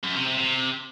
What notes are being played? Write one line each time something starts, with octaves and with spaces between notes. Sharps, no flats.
F#2
C3
C3
C3